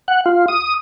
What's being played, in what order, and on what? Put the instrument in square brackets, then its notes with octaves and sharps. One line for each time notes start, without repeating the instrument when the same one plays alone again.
[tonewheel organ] F#5
F4
D#6